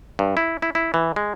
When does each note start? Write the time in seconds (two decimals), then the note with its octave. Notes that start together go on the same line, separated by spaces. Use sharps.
0.19 G2
0.37 E4
0.62 E4
0.75 E4
0.94 E3
1.16 G#3